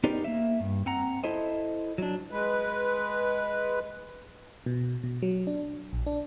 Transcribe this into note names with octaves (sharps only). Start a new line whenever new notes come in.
B3 D#4 G4 A#4 C5 D5
A#3 E5
G2
C4 F#5 A#5
E4 A4 C5 D#5
F#3 D4
G#3 B4
B2
B2
F#3
D4
A#1
D4